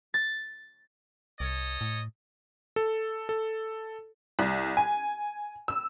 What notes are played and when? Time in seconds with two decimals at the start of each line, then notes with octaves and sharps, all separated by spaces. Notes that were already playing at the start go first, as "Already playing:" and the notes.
0.14 A6
1.40 C2 A4 C#5 D#5
1.81 A2
2.76 A4
3.29 A4
4.39 C2
4.77 G#5
5.68 E6